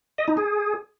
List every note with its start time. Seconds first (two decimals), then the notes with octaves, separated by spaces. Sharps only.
0.18 D#5
0.28 D#4
0.37 G#4